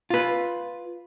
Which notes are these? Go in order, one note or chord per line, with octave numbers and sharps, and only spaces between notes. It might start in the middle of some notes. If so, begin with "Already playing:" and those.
F4 B4